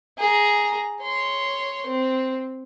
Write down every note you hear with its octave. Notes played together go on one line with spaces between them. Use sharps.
G#4 A#5
C#5 C6
C4